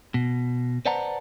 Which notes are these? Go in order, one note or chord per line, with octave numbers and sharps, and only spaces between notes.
B2
B4 C5 D5 F#5 A5 A#5